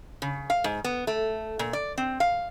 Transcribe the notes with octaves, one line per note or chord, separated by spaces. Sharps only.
C#3
F5
G#2
B3
A3
A#2
D5
C4
F5